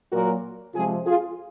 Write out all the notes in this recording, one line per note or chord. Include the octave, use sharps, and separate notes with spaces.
A#2 F#3 F#4 A#4
C3 F3 G#3 F4 G#4
F4 G#4